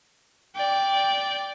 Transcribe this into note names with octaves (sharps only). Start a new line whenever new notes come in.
D5 G5